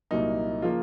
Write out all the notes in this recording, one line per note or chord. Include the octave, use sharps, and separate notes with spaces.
C2 A#2 F#3 A#3 D#4
C#3 F3 A#3 F4